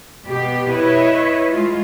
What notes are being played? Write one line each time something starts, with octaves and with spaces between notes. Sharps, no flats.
B2 G4
E4 B4 C#5 D#5 E5
G#3 F4